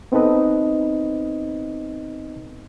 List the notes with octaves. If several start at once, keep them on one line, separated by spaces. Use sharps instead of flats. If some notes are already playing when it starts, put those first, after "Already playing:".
B3 C4 D#4 A4 B4 D#5